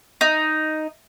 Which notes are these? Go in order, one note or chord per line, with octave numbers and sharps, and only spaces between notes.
D#4